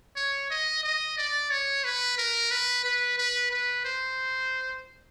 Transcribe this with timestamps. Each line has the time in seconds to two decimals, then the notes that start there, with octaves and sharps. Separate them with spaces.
0.16 C#5
0.50 D#5
0.83 D#5
1.17 D5
1.50 C#5
1.84 B4
2.18 A#4
2.51 B4
2.84 B4
3.18 B4
3.51 B4
3.85 C5